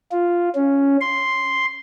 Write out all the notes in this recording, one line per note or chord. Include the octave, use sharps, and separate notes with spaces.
F4
C#4
C6